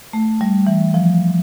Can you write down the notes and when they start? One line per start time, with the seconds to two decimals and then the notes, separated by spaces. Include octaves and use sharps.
0.13 A3
0.41 G3
0.67 E3
0.94 F3